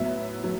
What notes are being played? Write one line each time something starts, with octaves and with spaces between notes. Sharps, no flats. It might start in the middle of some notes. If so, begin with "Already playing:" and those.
Already playing: A2 F#3 B3 E5
F#3 A3